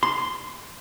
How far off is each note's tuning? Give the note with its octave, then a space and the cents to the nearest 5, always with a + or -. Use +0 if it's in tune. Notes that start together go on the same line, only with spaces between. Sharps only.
C6 +0